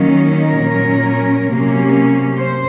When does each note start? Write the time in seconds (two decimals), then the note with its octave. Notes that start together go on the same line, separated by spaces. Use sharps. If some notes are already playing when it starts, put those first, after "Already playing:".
Already playing: D#3 F#3 A#3 C#4
0.15 A#4
0.61 A#2 F#3 C#4
1.50 C3 F#3 A#3 C#4
2.39 C5